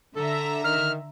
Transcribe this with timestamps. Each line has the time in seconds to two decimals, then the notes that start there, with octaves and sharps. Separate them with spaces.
0.16 D3 A4 E5 A#5
0.64 D#3 F6